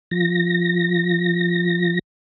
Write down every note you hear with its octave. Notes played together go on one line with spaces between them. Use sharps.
F3 A#6